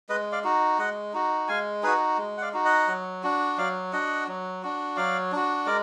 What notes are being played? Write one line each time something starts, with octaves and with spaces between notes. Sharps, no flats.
G#3 B4 D#5
D5 F5
D#4 F#4
G#3 D#5 F#5
D#4 F#4
G#3 F5 G#5
D#4 F#4 G#4 B4
G#3
F#5
D5 F5
D#4 F#4
D#5 F#5
F#3
D4 F#4
F#3 D5 F5
D4 F#4 D#5 F#5
F#3
D4 F#4
F#3 D5 F5
D4 F#4
G#3 A#4 D5